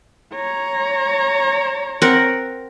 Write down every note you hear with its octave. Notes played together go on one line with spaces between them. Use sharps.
C#5 A#5
C4 A#4 F#5